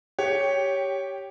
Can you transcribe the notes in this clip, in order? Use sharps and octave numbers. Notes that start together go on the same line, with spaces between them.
G4 C#5